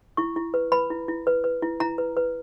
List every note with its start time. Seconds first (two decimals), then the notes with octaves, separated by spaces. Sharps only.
0.17 E4 C#6
0.36 E4
0.54 B4
0.72 B4 B5
0.90 E4
1.08 E4
1.27 B4
1.44 B4
1.62 E4
1.80 E4 A#5
1.98 B4
2.17 B4